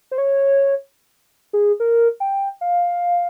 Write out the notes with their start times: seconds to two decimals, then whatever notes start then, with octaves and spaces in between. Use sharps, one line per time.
0.11 C5
0.18 C#5
1.53 G#4
1.80 A#4
2.20 G5
2.61 F5